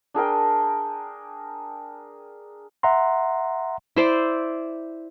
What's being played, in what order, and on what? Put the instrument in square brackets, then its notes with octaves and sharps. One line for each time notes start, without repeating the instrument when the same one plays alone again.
[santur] D4 G#4 A#4 G5
[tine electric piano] E5 F#5 A#5 C6
[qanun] E4 C5 D5